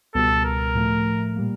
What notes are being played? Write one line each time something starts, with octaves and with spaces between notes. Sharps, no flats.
C#2 B2 G3 B3 A4
A#4
A2 F3 A3
A#2 G3 A#3